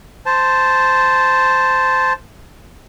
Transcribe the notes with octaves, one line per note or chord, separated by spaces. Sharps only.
C5 A5